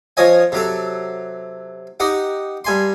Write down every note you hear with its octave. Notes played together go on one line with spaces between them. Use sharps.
F3 C#5 D#5 G#5
C3 F#3 A4
D#4 G4 F#5
G2 G#5 C6